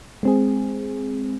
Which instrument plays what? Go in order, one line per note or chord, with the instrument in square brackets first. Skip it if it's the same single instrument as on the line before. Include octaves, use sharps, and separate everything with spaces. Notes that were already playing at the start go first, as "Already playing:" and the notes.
[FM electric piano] G#3 C4 G#4